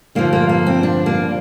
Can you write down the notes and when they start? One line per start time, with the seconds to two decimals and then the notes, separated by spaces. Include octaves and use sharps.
0.15 G2 D3 F3 A#3
0.33 A#3
0.49 A#3
0.66 C4
0.83 D4
1.06 A#3